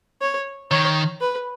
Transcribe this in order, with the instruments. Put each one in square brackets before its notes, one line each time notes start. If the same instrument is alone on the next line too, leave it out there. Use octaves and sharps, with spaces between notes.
[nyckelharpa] C#5
[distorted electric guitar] D#3 [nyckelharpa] C#5
[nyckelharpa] B4